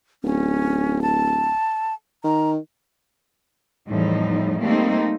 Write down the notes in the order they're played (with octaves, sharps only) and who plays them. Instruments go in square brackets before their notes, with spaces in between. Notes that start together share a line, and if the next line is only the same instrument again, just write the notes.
[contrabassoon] D1 [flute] C#4
[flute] A5
[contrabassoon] D#3 [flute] A#5
[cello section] E2 A2 F3 G3 D#4
G3 A3 A#3 C4 D#4